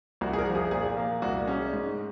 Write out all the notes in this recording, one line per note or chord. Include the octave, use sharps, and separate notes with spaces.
C2 F#4
G#4
A#4
F3
G#4
A#2 G#4
A#3
C2 F#4
G#3 C#4
G#2